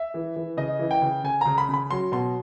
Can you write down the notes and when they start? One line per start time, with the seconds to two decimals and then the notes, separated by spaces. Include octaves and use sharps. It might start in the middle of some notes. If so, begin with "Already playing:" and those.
Already playing: E5
0.14 E3
0.36 E3
0.57 C#3 D#5
0.79 E3
0.91 G5
1.02 C#3
1.24 C#3 G#5
1.41 C#3 A#5
1.58 B5
1.69 C#3 B5
1.91 F#3 C6
2.12 B2 C6